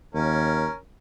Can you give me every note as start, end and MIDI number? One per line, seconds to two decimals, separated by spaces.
0.15 0.66 39
0.15 0.76 61
0.15 0.76 70